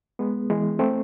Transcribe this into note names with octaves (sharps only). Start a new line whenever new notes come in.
G#3 B3
E3 G#3
A3 C4